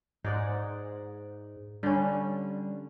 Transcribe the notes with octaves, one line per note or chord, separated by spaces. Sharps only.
G#2 D#4 D5 F#5
D3 G3 C#4